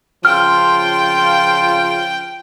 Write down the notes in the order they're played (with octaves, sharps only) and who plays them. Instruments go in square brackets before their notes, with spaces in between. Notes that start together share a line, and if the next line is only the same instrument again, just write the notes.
[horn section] C#3 F3 F4 [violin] G5 [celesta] F6